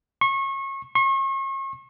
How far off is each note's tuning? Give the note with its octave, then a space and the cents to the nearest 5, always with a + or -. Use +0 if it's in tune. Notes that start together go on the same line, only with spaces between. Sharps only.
C#6 -30
C#6 -40